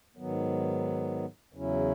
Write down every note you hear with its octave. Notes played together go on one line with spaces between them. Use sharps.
G#2 D#3 F#3 B3
E2 C#3 F#3 C#4 E4